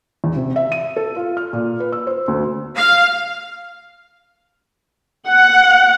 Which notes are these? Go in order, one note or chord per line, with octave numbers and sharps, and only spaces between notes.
E2
C3
E5
D#7
A4
F4
F6
A#2
B4
E6
C5
D2
F5
F#5